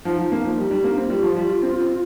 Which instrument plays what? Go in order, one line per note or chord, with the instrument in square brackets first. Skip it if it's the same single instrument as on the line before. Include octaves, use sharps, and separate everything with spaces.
[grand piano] F3 [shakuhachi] D#4
[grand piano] F3
A#3
F3
G3
G3
A#3
C4
[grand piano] G3 [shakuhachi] F4
[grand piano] F3
G3
C4
C4